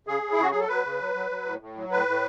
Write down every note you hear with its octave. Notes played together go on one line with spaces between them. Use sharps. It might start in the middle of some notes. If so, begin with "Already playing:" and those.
C#3 G#4
C#3
E4
C#3 F#4
F#3 G#4
A4
F#3 B4
C#3
F#3
F#3
F#3
A2
A2
F#3
A2 B4
A2